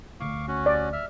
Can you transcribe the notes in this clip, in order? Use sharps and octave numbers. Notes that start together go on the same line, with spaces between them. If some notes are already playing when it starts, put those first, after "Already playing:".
D2 F5 C#6 D6
C#4 F#4
D5
E5 F6